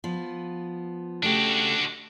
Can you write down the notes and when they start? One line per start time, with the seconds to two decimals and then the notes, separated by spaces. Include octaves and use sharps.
0.04 F3 B3
1.23 C#3 A3 D4 F#4 G4